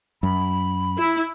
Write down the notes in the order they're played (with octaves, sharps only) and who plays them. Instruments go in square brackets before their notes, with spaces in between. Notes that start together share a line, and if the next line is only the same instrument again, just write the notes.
[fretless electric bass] F#2 [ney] B5
[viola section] E4